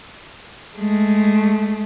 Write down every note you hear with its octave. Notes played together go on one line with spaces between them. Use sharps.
G#3 A3